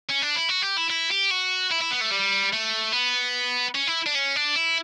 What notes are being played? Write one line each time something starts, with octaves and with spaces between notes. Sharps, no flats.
C#4
D4
E4
F#4
G4
E4
E4
G4
F#4
E4
E4
B3
A3
G3
A3
B3
C#4
E4
D4
C#4
D4
E4